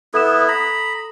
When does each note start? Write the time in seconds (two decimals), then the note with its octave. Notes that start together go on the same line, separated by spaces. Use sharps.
0.14 B3 E4 A4 D#6 E7
0.48 A#5 B5